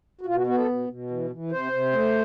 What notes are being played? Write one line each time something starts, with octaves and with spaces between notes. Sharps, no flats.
F#4
B2 F4
F#4
B3 F#4
A4
B2
B2
E3
E3
C3 C5
C3
A3